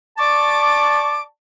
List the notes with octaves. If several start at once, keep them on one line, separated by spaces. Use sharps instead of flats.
D5 A5 C#6 D6